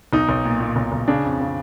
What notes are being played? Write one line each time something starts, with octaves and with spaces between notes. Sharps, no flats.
B1 D#4
B1
A#2
A#2
B1
B1
C#3 D4
F2
C#3